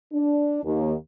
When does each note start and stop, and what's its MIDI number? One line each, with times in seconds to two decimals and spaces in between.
0.13 0.62 62
0.64 0.94 39